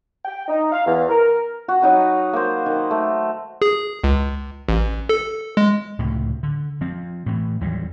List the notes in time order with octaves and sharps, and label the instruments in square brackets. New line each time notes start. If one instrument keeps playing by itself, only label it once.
[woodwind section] G5
D#4
F5
E2
A#4
[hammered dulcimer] F#4
F#3 D#4 B4
A#3 C5
D#3
A3
[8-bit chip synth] G#4
C#2
A1
A4
G#3
[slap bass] C#2 A2 C3 F3
D3
F3 C4
A2 E3
D#2 E3 F#3 G3